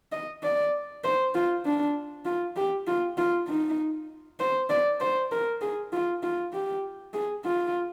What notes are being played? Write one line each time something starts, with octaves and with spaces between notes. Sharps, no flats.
D#5
D5
C5
F4
D4
F4
G4
F4
F4
D#4
C5
D5
C5
A#4
G#4
F4
F4
G4
G#4
F4